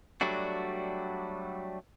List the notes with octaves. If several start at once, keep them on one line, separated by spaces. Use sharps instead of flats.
F#3 G3 A3 D4 F#4